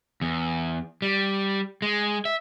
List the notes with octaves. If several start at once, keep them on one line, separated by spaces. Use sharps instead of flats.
E2
G3
G#3
E5